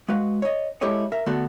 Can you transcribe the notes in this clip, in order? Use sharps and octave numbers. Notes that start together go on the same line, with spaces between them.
G#3 F#4 B4 F5
C#5 D#5
G#3 E4 G4 A4 C#5 D#5
A#4 E5
D3 A3 B3 D4 F#4 A4